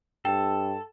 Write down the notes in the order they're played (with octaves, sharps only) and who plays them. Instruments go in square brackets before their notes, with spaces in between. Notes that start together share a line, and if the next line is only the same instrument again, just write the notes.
[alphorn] G2 [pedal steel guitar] A4 [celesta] G5